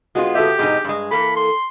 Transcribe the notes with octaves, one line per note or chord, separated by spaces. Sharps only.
G#3 B3 F4 F#4
F#4 G4 A4 E5
G#2 B2 D#4 G#4
G2 G#3
E3 A#3 A4 B5
C6